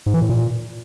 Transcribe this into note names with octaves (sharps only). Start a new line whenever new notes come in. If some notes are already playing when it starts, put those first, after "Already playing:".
G#2
E3
A2
A#2